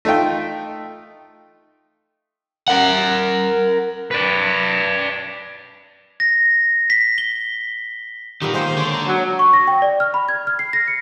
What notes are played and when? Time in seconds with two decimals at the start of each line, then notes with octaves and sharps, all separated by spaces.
0.05 A3 D#4 F4 G5
2.68 A#4 F#5
4.11 B4 D5
6.20 A#6
6.90 B6
7.18 G7
8.42 A#2 D#3 B3 G4
8.54 G#3 A#3 C5
8.77 D3 C#5
8.93 A#5
9.07 F#3
9.39 C#6
9.53 A#6
9.67 G5
9.82 D5
10.00 F6
10.14 B5
10.29 G#6
10.47 F6
10.59 C7
10.73 A#6
10.88 C#7